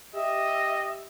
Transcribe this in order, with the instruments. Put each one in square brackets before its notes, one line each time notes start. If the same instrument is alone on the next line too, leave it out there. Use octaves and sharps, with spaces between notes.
[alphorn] G4 [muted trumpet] D#5 [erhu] E5